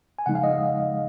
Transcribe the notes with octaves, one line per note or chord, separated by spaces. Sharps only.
G#5
C#3 F3 G#3 D#4 F#5
F5
D#5